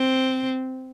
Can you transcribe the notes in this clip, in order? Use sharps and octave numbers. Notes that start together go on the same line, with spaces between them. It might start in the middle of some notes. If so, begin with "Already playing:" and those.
Already playing: C4